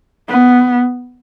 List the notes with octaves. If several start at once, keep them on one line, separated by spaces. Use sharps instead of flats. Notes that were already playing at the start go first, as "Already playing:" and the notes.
B3